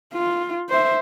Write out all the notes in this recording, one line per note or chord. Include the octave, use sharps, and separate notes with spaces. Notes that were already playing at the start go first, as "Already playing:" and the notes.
F4
C5 E5